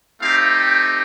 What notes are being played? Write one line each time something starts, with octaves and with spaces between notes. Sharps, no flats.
A3 C4 D#4 G4 F5